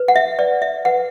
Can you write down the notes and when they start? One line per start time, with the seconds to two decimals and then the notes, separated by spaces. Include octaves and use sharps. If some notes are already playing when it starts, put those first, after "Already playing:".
Already playing: B4
0.08 F#5
0.16 E5
0.39 B4 D5
0.62 E5
0.85 B4 F#5